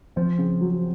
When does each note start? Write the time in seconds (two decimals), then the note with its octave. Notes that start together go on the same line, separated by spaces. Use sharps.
0.16 F3 C4
0.38 C#3
0.61 F#3